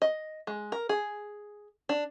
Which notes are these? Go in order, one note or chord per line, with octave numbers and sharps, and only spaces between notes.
D#5
G#3
A#4
G#4
D4